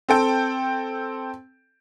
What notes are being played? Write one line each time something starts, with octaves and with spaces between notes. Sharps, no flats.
C4 A4 G5